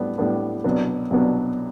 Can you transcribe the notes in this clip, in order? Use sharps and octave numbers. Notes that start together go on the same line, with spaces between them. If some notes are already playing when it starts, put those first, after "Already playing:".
Already playing: A2 G3 B3 D4
A2 G3 B3 D4
C2 B2 F#3 B3 D4
C2 B2 F#3 B3 D4